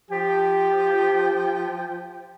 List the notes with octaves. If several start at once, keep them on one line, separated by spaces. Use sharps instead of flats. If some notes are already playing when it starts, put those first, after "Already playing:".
F3 G4 G5